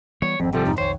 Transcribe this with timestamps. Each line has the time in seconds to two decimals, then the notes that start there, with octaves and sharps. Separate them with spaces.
0.22 E3 G3 B3 C#5
0.40 G#1 F2 C4
0.53 C3 F3 G3 A4
0.66 F2 G#2 D#4
0.78 B1 F2 D#3 C5 C#5